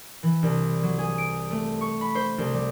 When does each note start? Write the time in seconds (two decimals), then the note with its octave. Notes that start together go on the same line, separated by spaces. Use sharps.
0.23 E3
0.43 C2
0.83 F#3
0.99 G#4
1.18 D7
1.51 A3
1.81 C#6
2.01 B5
2.15 C5
2.38 C2
2.54 G3